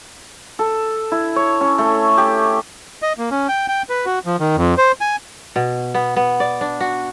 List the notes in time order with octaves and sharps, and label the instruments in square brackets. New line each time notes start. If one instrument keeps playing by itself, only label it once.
[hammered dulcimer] A4
E4
C#5
C#4
A3
G4
[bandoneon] D#5
A#3
C#4
G5
G5
B4
F#4
F3
D#3
F2
C5
G#5
[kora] B2
B3
B3
D5
D4
F#4